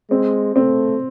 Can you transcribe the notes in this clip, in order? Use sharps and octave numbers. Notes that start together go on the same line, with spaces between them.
G#3 C4
A3 C4